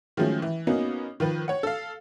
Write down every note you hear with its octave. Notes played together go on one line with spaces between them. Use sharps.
D#3 F3 F#3 G#3 A3 C#4
E3
A#3 B3 C#4 D#4 F#4
D#3 F3 B4
C#5 F#5
A4 F5